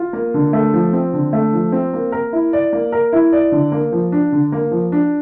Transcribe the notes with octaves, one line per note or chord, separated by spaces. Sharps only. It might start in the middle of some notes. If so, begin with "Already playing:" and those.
Already playing: F4
A#3
D3
A3
F3
C4
D3
A3
F3
C4
A#3
A#4
E4
D5
A#3
A#4
E4
D5
D3
A#3
F3
D4
D3
A#3
F3
D4